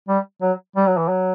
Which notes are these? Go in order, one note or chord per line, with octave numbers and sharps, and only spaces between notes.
G3
F#3
G3
F#3
E3
F#3